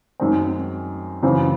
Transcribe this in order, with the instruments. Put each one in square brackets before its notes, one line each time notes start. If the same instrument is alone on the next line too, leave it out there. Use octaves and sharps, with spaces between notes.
[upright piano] F#2 D#3 G#3 C4
F#2 C#3 E3 C4